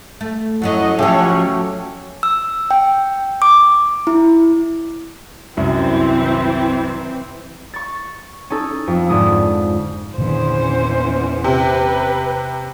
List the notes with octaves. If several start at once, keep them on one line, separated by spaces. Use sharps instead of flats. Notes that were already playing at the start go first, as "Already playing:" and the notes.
A3
F#2 A2 F#3 C#4 D#5 F#5
C#3 F3 A3 C#4 G4 A4 C#5 F#5
F#3
E6
G5
D6
E4
C2 F#2 E3 C4
C#6 A6
C#4 D#4 A4
F2
G#2 D3 G#3 D#6
E2 A#2 D3 D#3 C#4 C5
C3 B4